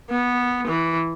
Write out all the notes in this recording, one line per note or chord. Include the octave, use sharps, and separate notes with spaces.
B3
E3